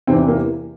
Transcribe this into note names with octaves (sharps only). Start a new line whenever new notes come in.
E2 C3 E3 C4
A#3